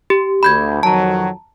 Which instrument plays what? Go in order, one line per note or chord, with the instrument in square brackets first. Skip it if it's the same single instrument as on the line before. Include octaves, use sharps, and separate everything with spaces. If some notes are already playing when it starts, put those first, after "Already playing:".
[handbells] G4
[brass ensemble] D2 [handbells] B5 G6 G#6
[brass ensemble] F2 D#3 F#3 [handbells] A5 A#5